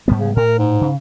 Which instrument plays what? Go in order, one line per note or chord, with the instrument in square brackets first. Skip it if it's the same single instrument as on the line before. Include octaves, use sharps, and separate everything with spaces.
[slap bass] G#2 G3 B3
[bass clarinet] C#3
[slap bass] A2 [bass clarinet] A#4
[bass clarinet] G#2
[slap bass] C#3